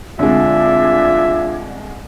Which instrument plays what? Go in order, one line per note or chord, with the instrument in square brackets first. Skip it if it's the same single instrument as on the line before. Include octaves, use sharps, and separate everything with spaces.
[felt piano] C2 D3 G#3 [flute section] D4 G#4 G#6 [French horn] F4 [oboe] E5